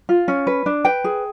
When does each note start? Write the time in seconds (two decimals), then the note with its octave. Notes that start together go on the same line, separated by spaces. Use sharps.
0.09 F4
0.28 C#4
0.47 B4
0.66 D4
0.85 B4 G5
1.04 G#4